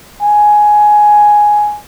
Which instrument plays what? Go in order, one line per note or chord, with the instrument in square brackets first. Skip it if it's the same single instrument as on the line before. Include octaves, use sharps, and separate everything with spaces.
[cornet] G#5